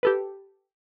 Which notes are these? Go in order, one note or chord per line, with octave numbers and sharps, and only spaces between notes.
G4 A4 B4